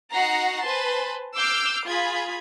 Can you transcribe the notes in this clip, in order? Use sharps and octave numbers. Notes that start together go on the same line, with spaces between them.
D#4 F#4 F#5 A#5 A#6 C7
B4 C5 G#5 A5 C6
D6 E6 F6 G6 C7 D7
F4 G#4 B5 G#6